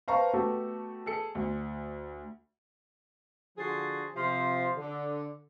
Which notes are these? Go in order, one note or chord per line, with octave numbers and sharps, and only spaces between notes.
B4 C5 F5 A5 A#5 C#6
A3 B3 F#4 G4 A4
G#4 A4 C#7
D2
D3 F3 F#4 G#4 A5 C6
C3 F3 C6
D3